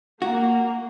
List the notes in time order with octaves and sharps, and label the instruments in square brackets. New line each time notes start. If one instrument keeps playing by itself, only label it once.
[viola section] A#3 [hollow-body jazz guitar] F#4